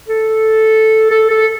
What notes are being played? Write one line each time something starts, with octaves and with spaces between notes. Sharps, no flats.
A4
A4
A4